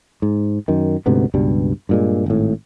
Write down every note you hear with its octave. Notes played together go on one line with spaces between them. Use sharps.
G#2
F#2 D#3
D2 G#2 C3 B3
C#2 G2 B2 G3
G2 A#2 G#3
G#1 A2